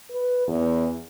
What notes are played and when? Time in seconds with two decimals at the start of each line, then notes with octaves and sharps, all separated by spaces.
0.11 B4
0.48 E2